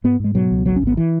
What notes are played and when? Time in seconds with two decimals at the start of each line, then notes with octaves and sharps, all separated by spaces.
0.04 G#2 B3
0.20 G#2 G#3
0.35 B2 F#3
0.51 C#2
0.66 G#1 F#3
0.76 C#4
0.82 G#1 B3
0.97 E3